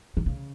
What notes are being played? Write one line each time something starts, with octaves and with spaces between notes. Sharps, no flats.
D#3
C#3